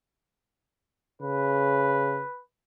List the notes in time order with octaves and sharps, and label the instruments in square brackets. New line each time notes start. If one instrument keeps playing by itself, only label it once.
[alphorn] C#3 [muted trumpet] B4